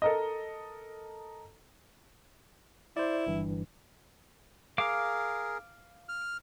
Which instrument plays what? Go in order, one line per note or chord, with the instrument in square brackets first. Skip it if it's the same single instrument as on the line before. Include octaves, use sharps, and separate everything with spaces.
[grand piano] A4 A#4 D#5
[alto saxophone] E4 [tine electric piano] C5 D5
[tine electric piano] G1 G2 E3
[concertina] G#4 A#4 [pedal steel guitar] F5 D6
[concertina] F6